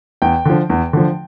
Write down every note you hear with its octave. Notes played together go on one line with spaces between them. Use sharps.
E2 G5
D3 F3
E2
D3 F3